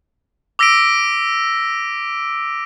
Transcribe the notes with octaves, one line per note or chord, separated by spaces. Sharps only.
D6 E6 A#6 B6 D7